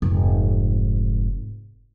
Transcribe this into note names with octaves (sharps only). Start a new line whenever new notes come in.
F1 G#2